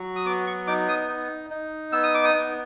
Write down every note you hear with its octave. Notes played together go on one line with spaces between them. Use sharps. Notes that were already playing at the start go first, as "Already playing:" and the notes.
Already playing: F#3 F#4
D#6
B3 D6
C#6
D#4 D6
D#6
D#4
D#4
B3 E6
D#6
D6
D#6
B3